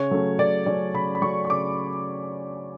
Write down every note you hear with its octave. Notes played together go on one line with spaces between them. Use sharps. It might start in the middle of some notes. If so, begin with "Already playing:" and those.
Already playing: C#3 C#5
F#3 A3 C#4
C#3 D5
F#3 A3 C#4 D5
C#3 B5
B5
F#3 A3 C#4 C#6
C#6
C#3 D6